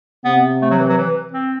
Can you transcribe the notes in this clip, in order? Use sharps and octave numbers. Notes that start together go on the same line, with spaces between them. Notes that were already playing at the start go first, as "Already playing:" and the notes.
C3 B3
A3
F#3
E3
F#3
E3
C4